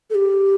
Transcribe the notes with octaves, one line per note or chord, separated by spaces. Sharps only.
A4
G4